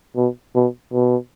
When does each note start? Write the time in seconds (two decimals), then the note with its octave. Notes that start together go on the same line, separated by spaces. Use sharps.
0.16 B2
0.55 B2
0.93 B2